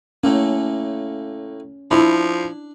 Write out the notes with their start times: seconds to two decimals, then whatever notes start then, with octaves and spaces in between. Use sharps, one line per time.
0.24 A2 A3 A#3 C#4
1.91 F3 D4 E4